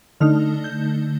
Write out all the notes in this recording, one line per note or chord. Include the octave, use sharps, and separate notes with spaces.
D3 A3 D#4 F6
G6